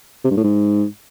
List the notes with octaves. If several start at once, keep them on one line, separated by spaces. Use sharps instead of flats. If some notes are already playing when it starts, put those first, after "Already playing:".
C3
G2
A2
G#2